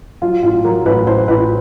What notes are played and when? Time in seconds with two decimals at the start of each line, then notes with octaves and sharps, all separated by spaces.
0.22 F#3 F4
0.43 A1 F4
0.64 F#3 A#4
0.85 A1 B4
1.06 A1 C5
1.28 A1 B4